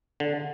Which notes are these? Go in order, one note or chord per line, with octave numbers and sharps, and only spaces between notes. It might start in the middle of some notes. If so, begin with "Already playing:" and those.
D3